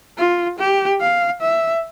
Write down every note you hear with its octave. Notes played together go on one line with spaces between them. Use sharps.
F4
G4
F5
E5